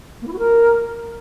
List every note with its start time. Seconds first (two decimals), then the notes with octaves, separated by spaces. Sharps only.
0.22 A#3
0.27 E4
0.33 F#4
0.39 A#4